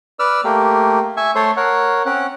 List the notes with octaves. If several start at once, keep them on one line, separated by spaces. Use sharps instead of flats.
B4 D5 E6 F6
A3 A#3 G4
E5 G#5 C#6
A3 A4 C5 C#5 C6
A#4 C#5 F#5
C4 C#4 F#5